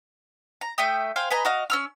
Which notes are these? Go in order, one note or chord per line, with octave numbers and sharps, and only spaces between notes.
A#5
A3 E5 G5 D#6
C5 F5 G5 G#5
B4 D#5 G#5 A#5
F#4 D#5 F5
C#4 E6 F6